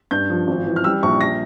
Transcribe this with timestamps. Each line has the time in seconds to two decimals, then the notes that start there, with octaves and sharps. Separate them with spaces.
0.11 G2 G6
0.30 F3
0.47 G#1
0.66 E3
0.76 F6
0.84 G3 E6
1.03 A#1 C#6
1.21 A#6